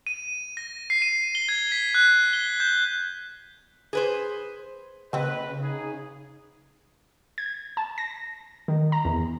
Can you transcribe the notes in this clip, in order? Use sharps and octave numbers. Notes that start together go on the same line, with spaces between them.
D#7
A#6
C7
D#7
G7
G#6
B6
F#6
G7
G6
G#4 B4 C5
C#3 A#3 C4 F#4 B4 D#5
D#4 G#4
G#6
A5
A#6
D#3
A#5
E2